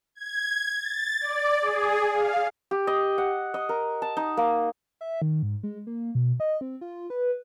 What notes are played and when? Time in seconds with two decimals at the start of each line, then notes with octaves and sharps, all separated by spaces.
0.15 G#6
0.77 A6
1.21 D5
1.62 G#4
2.13 F5
2.71 G4
2.87 D#5
3.18 F#5
3.54 D#5
3.69 A#4
4.02 A5
4.17 D#4
4.37 A#3
5.01 E5
5.22 D#3
5.43 G#2
5.63 G#3
5.87 A#3
6.15 B2
6.40 D#5
6.61 C4
6.81 F4
7.10 B4